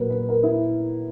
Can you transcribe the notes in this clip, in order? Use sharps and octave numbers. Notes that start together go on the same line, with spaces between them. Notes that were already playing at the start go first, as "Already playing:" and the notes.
Already playing: A#2 F#3 A#3 A#4 B4
B4
A#4
E4